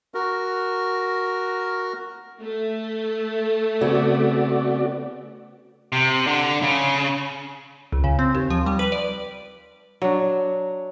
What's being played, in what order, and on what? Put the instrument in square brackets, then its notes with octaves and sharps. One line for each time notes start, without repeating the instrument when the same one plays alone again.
[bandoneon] F#4 A#4
[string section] A3
[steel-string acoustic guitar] C#3 B3 C4 [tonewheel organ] F#4 D5
[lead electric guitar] C3
D3
C#3
[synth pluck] C#2
C#3
C4
D#2
F3
G3
B4
D5
[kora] F#3 D4